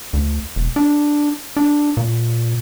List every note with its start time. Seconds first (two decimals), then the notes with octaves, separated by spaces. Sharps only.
0.13 D2
0.56 E1
0.76 D4
1.57 D4
1.97 A#2